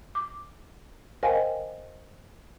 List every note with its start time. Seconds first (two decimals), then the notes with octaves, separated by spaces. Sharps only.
0.15 D6
1.23 A#4 C5 D#5 F5 G5 G#5